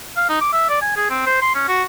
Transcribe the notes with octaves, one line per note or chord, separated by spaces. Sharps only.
F5
D#4
D6
E5
D5
G#5
G#4
C4
C5
C6
C#4
F#4